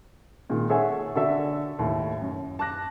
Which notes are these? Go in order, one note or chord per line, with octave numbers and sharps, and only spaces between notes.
A#2 D#3 G#3
G#4 A4 C#5 E5 F#5 G#5
D3 F#4 A4 D5 E5
D#2 A2
F#2
A5 D6 F#6 A#6